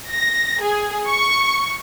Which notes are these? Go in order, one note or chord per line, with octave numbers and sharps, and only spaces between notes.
A#6
G#4
C#6